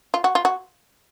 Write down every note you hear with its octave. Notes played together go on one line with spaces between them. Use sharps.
F4
F#4
F4
F#4